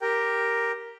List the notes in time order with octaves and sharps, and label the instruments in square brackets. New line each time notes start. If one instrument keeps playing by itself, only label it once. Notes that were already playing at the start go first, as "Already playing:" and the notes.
[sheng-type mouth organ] G4 A#4 G5